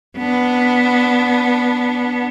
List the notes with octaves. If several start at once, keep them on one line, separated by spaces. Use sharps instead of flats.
B3 D4